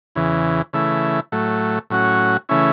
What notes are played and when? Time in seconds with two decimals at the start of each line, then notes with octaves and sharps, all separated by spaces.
0.15 E2 C#3 E3
0.73 C#3 E3 A3 E4
1.32 A2 F#3 A3
1.90 A2 F#3 C#4 F#4
2.49 C#3 E3 A3 C#4 E4